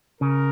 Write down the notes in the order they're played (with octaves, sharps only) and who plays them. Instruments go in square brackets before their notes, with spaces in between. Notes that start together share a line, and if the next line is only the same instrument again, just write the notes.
[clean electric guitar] C#3 [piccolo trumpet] A#4